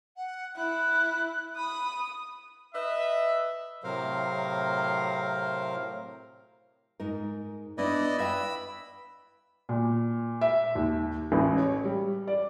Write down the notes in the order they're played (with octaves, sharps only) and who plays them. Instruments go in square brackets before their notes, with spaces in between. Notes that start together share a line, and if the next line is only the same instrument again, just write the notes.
[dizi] F#5
[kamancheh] E4 [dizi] F#6
[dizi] B5 [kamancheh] D#6
[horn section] B4 D#5 E5
[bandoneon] A2 C3 F#3 A#4 C5 F5
[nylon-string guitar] G#2 D#4 A#4
[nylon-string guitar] B3 D4 [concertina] E4 D5 D#5
[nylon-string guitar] B4 E5 G5 [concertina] B5 E6
[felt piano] A#2
E5
D#2
A1
C#5
G3
D5